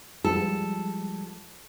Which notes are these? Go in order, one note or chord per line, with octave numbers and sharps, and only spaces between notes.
F3 G3 G#3 A4